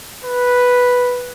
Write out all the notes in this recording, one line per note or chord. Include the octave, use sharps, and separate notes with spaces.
B4